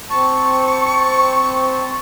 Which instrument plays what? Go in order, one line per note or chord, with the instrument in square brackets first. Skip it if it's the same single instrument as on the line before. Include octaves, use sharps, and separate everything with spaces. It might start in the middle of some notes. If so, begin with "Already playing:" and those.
[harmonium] C4 A5 [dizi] C#6